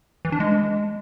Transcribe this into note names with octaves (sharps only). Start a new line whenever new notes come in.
E3
D4
G#3